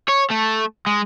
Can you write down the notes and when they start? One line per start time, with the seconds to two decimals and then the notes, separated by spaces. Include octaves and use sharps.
0.09 C#5
0.31 A3
0.86 G#3